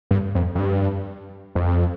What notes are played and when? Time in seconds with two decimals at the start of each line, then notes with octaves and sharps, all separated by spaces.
0.11 G2
0.35 F2
0.55 F2
0.58 G2
1.55 F2